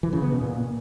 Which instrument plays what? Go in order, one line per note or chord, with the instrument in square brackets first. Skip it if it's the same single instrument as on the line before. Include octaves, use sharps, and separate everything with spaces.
[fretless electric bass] E3
C#3
B3
B2
A#2